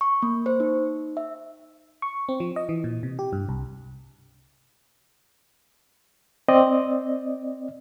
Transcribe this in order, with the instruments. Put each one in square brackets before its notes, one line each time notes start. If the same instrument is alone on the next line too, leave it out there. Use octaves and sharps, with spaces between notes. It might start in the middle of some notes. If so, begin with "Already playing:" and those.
[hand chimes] C#6
A#3
C5
D#4
E5
[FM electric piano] C#6
C4
F3
D#5
E3
A#2
C3
G4
G2
C2
[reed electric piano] C4 D5 D#5